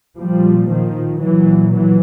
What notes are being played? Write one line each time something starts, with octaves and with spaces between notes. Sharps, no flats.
A#2 F3 G3
D#3 F3
A#2 E3 F#3
E3 F#3